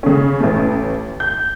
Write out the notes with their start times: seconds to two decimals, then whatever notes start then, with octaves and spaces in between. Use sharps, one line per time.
0.03 C#3 C#4
0.40 A1 A3
1.20 G6